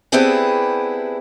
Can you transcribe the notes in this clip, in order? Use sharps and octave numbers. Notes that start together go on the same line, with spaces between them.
B3 C4 D4 E4 G4 G#4